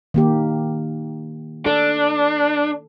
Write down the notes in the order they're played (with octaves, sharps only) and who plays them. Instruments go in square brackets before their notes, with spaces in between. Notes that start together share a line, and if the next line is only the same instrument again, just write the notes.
[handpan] D#3 A#3 G4
[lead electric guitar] D4 [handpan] A4